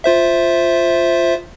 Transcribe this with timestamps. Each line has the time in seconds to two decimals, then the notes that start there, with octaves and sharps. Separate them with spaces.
0.04 F4 C5 E5